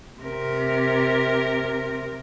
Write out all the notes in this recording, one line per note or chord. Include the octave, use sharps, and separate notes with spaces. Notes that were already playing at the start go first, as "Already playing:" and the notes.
C3 A#4